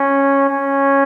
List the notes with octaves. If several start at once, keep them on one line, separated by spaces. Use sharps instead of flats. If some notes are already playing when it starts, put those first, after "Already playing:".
Already playing: C#4
C#4